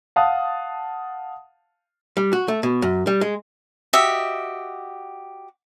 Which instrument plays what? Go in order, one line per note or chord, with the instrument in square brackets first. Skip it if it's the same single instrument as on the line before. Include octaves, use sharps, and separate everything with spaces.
[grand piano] F5 F#5 A5 D#6
[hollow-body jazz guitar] G3
F#4
A3
B2
F#2
G3
G#3
[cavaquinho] F#4 G4 D#5 E5